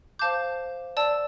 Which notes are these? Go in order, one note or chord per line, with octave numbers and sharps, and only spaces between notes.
C5 F5 A5 D6 G6
D5 A5 E6